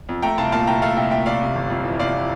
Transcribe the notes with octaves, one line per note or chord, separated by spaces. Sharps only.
F2
A3 G5 A#5
C2 F5 A5
A#2 F5 A5
C2 G5 A#5
A3 F5 A5
C2 E5 G5
A#2 E5 G5
C2 D5 F5
C3
G1
F2
E3
C3 D5 F5